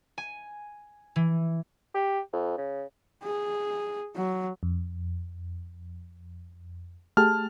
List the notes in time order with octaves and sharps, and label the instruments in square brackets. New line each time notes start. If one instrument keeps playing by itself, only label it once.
[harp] G#5
E3
[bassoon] G4
F2
C#3
[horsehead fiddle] G#4
F#3
[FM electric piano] F2
[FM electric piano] A3 G4 G#4 [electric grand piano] A5 F6